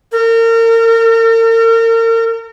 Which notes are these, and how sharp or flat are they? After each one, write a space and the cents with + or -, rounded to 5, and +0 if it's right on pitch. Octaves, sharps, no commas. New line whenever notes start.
A#4 -35